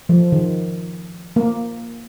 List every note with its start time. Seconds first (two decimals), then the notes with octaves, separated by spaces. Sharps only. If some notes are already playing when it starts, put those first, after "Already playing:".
0.09 F3
0.32 D#3
1.36 A#3